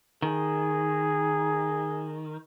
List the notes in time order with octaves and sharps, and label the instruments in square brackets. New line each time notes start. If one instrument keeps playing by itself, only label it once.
[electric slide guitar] D#3 [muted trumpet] G#4